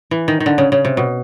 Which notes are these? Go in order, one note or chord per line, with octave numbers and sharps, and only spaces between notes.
E3
D#3
D#3
D3
C#3
C#3
C3
B2